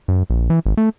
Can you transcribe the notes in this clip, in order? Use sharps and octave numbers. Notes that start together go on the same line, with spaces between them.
F#2
A#1
E3
G#1
A3